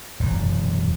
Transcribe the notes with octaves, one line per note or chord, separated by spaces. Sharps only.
E1 F#2